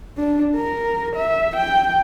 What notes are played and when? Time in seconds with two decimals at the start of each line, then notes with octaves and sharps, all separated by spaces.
0.17 D4
0.56 A#4
1.16 E5
1.56 G5